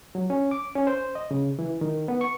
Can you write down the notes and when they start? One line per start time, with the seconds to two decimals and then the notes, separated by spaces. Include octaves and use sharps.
0.15 F#3
0.30 C#4
0.51 D6
0.75 C#4
0.87 C5
1.15 D#5
1.31 C#3
1.59 E3
1.81 D#3
2.08 B3
2.21 C#6